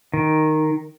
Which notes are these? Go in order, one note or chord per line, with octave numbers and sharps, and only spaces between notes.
D#3